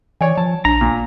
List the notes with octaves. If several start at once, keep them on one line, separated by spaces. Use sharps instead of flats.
E3 C#5 D5 G#5
F3 A5
A#1 D4 A#5
A#2